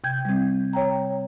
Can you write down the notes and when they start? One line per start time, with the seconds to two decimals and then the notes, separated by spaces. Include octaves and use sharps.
0.04 C3 G5 G6 G#6
0.25 G3 C4
0.73 C#5 G5 A#5